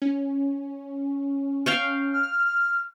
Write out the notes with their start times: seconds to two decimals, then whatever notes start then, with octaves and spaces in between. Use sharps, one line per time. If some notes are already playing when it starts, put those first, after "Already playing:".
0.02 C#4
1.66 F5 G5 C#6
2.13 F6